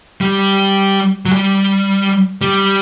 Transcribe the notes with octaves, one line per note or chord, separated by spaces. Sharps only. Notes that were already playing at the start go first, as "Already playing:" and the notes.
G3
F#3
G3
G3